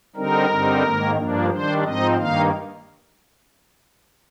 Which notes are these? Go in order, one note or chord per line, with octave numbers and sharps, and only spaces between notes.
D3 G3 C4 D#4 A#4
G2 D3 G3 C4 D#4
G#2 D#3 A#3
G2 F3 A#3 D4
D#3 G3 D4 C5
G#2 F3 C4 D#4 D#5
G2 D#3 A#3 D#4 F5